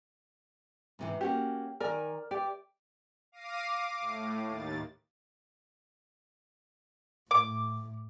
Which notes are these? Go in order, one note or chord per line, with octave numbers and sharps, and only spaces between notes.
G#2 C3 E3
A#3 C#4 F#4 G4
D#3 A#4 D5 G#5
G4 D5
F5 D6 A#6 C7 D#7
D6
A2
D#2 A6
A2 D6